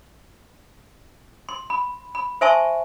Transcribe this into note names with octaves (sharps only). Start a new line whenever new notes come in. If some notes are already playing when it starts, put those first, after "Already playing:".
C6
B5
B5
C5 E5 G#5 A5 C6 C#6